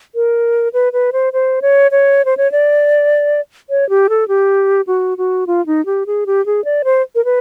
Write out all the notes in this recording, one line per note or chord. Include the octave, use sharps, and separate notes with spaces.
A#4
B4
B4
C5
C5
C#5
C#5
C5
C#5
D5
C#5
G4
A4
G4
F#4
F#4
F4
D#4
G4
G#4
G4
G#4
D5
C5
A#4
B4